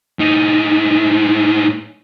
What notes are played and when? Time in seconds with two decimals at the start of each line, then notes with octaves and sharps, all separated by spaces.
0.19 A2 D#4